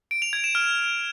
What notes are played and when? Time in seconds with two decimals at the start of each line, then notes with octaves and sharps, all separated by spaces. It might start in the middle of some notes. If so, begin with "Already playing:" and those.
0.11 D7
0.22 F7
0.33 G#6
0.44 E7
0.55 F6